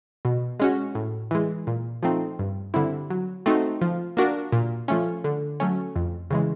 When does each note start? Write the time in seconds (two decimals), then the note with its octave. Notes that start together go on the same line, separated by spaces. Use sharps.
0.25 B2
0.60 G#3 C#4 F#4
0.95 A2
1.31 E3 G#3
1.67 A#2
2.03 F3 A3 C4 D#4
2.39 G2
2.74 D3 G3 C4 E4
3.10 F#3
3.46 A3 C4 D#4 F#4
3.81 F3
4.17 A#3 D4 F#4 A#4
4.52 A#2
4.88 F3 A3 C#4
5.24 D3
5.60 F#3 A3 C#4
5.96 F2
6.31 C#3 E3 G#3